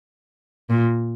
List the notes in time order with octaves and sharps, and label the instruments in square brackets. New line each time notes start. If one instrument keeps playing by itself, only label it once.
[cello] A#2